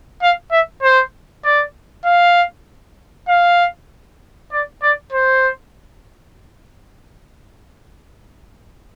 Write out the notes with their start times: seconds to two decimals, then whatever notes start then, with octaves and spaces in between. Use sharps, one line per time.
0.22 F5
0.51 E5
0.83 C5
1.44 D5
2.05 F5
3.28 F5
4.52 D5
4.82 D5
5.12 C5